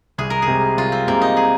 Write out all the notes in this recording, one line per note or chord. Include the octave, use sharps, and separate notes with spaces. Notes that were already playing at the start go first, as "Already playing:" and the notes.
C2 G#4
A#4
G#4
C3 G#3
C2 F4
C4
C3 G#3 A#3
D#4
G#4